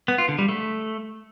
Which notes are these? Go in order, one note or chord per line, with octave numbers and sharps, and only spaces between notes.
B3
F4
D3
G3
A3